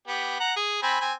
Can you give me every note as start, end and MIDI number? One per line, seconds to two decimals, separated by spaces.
0.08 0.39 59
0.08 0.39 67
0.40 0.53 78
0.40 0.53 82
0.57 0.80 68
0.83 1.00 60
0.83 1.00 80
0.83 1.00 83
1.01 1.13 60
1.01 1.13 80